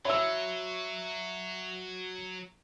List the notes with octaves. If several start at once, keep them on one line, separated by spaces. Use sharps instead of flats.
F#3 C#5 E5 B5 E6